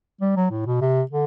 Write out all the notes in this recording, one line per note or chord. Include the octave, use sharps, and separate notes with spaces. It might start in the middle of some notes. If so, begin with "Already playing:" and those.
G3
F#3
A2
B2
C3
D3